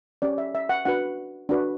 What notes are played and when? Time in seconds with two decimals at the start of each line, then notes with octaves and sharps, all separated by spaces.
0.22 C#4 G4 C#5 D5
0.38 E5
0.55 E5
0.69 F#5
0.85 D4 F#4 B4 F#5
1.49 D4 F#4 B4